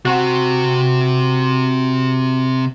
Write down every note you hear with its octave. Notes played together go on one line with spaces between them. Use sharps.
C3 C4 F#4